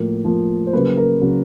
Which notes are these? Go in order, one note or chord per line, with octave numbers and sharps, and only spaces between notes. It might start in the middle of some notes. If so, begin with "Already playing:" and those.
Already playing: A2 F3 A#3
A2 F3 A#3
C5
C#3 F#3 A#3 B4
A#4
C#3 F#3 A#3